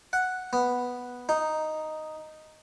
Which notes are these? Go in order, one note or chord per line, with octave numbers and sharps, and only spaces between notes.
F#5
B3
D#4